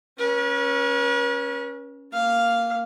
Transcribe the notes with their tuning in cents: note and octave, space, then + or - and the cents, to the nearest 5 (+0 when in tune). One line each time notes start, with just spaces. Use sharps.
C#4 +0 B4 -45
A#3 -5 F5 +0